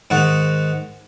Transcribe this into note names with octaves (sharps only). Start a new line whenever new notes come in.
G#2 D#3 F#5 C#6